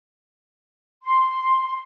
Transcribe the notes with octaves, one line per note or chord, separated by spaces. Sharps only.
C6